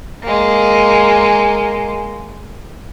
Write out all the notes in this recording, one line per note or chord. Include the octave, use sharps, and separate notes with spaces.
G#3 A#3